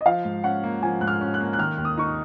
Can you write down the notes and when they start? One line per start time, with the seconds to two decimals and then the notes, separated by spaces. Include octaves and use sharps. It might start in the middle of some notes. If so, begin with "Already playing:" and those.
0.01 D#5
0.06 F3 F5
0.25 G#2
0.44 C#4 F#5
0.63 A#3
0.82 F3 G#5
1.01 G#2 F#6
1.07 F6
1.21 C#4
1.34 F#6
1.40 A#3
1.53 F#6
1.59 D#3 F6
1.78 D#2
1.85 D#6
1.97 D#4 C#6